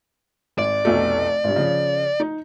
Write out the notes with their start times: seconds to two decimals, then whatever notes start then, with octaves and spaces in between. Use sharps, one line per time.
0.58 G#1 D5
0.85 F1 B1 A3
1.44 G#1 G2
1.56 C#3 F3
2.20 D#4